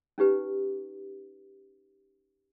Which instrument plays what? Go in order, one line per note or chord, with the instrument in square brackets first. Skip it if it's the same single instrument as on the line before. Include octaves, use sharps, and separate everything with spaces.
[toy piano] C#4 D#4 G4 B4